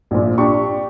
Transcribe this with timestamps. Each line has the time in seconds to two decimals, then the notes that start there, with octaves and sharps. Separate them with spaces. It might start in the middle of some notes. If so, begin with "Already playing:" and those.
0.11 A#1 A#2
0.38 D4 G4 C#6